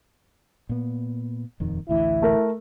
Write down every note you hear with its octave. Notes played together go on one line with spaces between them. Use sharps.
A#2 B3
D#1 F2 D#3
A1 D2 E3 E4
A3 A#4